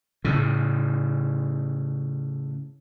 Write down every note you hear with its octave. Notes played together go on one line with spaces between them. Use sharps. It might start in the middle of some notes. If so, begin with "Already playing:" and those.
A2 C#3